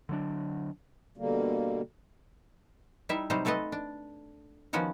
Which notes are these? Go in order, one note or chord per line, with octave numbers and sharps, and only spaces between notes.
D3 F#3 D4
B2 D3 G3 A#3
G3 D#4 E4 E5
C3 F#3 G3 D#4 C5
A3 C4 A4 B4 D#5
D4
D#3 F3 B3 C#4 F#4 G4